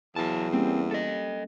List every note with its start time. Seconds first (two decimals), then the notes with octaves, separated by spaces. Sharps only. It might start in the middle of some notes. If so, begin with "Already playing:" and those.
0.16 E2 F#3 A5
0.53 G3 A#3 C4 C#4
0.91 A4 D#5